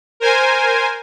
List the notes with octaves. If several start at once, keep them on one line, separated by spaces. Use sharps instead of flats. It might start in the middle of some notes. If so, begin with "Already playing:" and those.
A#4 C5 G#5